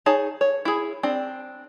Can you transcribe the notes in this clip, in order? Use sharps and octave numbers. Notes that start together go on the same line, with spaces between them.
D#4 G#4 C#5 A5
C#5
E4 G#4
C4 D4